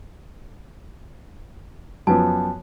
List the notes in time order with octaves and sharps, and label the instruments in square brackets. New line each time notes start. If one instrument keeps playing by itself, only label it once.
[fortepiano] F#2 F3 B3 [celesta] A5